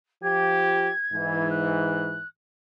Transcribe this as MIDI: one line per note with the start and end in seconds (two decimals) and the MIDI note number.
0.22 0.90 53
0.22 0.90 67
0.22 1.48 92
1.13 2.20 44
1.13 2.20 52
1.50 2.27 90